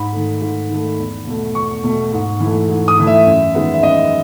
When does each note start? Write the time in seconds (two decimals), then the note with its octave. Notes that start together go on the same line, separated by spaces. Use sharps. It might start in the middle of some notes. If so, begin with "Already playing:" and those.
Already playing: G#2 B5
0.13 D#3 A3
0.42 G#2
0.69 D#3 A3
0.98 E2
1.27 B2 A3
1.55 E2 C#6
1.84 B2 A3
2.12 G#2
2.40 E3
2.46 A3
2.69 G#2
2.88 D#6
2.98 E3 A3
3.07 E5
3.26 F#2
3.55 D#3 G#3 B3
3.74 E5
3.83 F#2 D#5